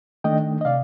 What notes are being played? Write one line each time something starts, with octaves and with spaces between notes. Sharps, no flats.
D#3 A3 D4 D#5 G5
D#5
C3 D5 F5